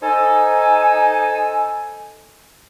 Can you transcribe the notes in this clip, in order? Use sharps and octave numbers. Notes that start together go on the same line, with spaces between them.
D#4 A4 C5 G#5